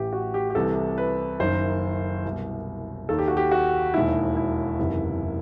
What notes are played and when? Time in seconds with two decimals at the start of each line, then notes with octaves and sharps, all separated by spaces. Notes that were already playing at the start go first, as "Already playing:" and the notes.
Already playing: A1 A2 E3 G4
0.13 F#4
0.34 G4
0.50 G4
0.55 C2 C3 E3 A4
0.98 B4
1.40 F#1 F#2 D#3 C5
2.25 C2 B2
3.09 D#2 D#3 A4
3.18 G4
3.28 F#4
3.37 G4
3.51 F#4
3.94 E1 D#2 D#3 E4
4.37 E4
4.79 F#1 E2 C3 D#3